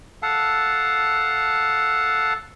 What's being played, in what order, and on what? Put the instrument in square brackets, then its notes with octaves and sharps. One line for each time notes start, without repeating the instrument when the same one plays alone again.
[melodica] A4 F5 F#5 A5